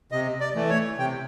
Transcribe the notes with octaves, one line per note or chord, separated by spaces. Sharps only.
C3 D#5
D5
E3 A3
C#5
C3 G5